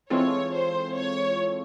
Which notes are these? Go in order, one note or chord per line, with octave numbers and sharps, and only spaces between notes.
E3 G#3 C4 F4 A4 C#5
C5
C#5